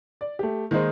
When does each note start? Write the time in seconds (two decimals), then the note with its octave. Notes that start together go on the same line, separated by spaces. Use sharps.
0.21 D5
0.39 A3 G4
0.71 D#3 G#3 A#3 D#4 C5